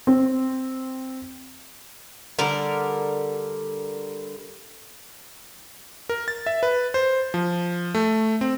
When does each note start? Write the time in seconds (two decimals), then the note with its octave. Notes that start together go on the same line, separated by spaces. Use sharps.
0.07 C4
2.39 D3 G3 A#4
6.09 A#4
6.28 A6
6.46 E5
6.63 B4
6.94 C5
7.34 F3
7.94 A3
8.41 C4